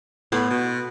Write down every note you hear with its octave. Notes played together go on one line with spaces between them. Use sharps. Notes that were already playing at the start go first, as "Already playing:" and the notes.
A2 B3 C6
B2